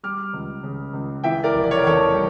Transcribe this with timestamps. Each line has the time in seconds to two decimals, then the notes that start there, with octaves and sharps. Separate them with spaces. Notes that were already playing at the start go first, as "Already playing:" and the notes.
0.03 G3 D6 F6
0.33 C#2
0.63 C#3
0.93 C#2
1.24 E3 E5 G5
1.44 A#4 D5
1.54 F1
1.64 D5
1.71 C#5
1.79 A#4
1.84 E2 A4 C#5
2.14 G3